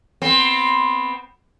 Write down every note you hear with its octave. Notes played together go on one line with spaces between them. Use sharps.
B3 C4